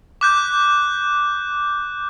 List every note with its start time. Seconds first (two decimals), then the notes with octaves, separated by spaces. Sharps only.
0.21 D6 F#6 G6